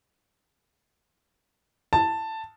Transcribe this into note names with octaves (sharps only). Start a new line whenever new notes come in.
A5